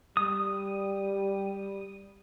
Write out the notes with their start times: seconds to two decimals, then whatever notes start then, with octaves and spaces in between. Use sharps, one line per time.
0.17 G3 D#6